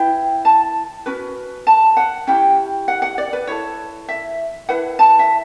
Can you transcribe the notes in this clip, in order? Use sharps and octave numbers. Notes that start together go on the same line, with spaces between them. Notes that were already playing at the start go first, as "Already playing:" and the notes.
Already playing: E4 B4 G5
A5
C#4 F#4 B4
A5
F#5
C#4 E4 G4 G5
F#5
F#5
D5
B4
E4 A4 C#5
E5
E4 B4 F#5
A5
E5